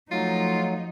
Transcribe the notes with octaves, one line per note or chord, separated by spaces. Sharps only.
F3 F#3 A3 D#4 F4